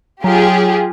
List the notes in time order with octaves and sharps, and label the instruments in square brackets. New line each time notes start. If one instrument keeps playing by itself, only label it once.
[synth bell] F#3 [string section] F4 G4 G#4